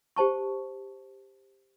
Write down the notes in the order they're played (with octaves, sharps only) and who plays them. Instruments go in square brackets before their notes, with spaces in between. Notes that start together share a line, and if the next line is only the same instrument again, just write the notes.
[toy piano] G4 C5 A5 C#6